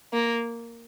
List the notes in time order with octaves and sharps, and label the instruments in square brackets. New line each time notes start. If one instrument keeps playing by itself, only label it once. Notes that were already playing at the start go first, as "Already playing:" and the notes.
[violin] A#3